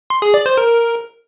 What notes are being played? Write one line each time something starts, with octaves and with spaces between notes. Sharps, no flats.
C6
G#4
D5
C5
A#4